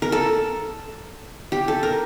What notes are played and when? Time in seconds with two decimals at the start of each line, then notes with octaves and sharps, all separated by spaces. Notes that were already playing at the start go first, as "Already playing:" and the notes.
0.02 A#4
0.12 A4
1.52 G4
1.68 A4
1.83 A#4